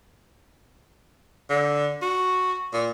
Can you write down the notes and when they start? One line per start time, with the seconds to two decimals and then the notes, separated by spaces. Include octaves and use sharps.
1.49 D3
2.02 F#4
2.73 A#2